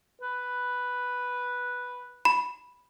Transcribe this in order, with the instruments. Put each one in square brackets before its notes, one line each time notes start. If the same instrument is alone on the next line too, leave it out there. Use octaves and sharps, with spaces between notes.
[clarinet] B4
[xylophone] B5